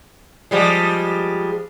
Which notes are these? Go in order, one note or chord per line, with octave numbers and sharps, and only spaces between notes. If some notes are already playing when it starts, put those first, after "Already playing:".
F3 G3 G#3